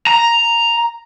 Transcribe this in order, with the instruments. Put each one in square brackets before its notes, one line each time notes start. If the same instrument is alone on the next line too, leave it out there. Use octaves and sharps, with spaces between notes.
[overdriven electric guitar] A#5